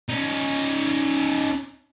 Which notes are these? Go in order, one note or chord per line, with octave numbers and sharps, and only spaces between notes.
C#4 D#4